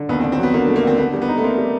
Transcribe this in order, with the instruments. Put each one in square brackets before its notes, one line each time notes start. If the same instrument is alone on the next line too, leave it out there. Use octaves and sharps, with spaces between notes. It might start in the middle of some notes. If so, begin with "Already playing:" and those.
Already playing: [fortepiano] D3
[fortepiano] D#2 [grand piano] B3
[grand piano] C4
[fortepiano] D3
[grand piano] C4
[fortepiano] F#3 [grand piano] B3
[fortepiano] D3 [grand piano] A#3
[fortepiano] A3
[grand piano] A#3
[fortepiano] D3 [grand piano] C4
[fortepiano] D3 [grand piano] B3
[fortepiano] G3
[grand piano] B3
[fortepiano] D#4
[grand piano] A3
[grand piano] A#3 [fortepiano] C4
[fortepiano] G3